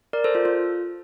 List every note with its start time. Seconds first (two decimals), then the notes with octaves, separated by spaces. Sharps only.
0.13 A#4 D5
0.24 A4 C5
0.34 F4 A4
0.45 F4